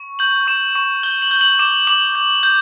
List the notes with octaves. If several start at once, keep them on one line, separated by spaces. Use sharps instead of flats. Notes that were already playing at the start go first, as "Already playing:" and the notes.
Already playing: C#6
G6 F#7
C#6 E7
C#6
G6 G7
F#7
G6
F#7
D6 E7
D6 F#7
G6
G6